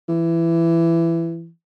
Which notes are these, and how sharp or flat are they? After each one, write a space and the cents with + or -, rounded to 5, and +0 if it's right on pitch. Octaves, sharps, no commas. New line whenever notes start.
E3 +20